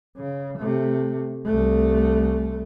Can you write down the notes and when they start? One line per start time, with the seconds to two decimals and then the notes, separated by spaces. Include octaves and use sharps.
0.17 C#3
0.57 C3 A3
1.45 C2 A3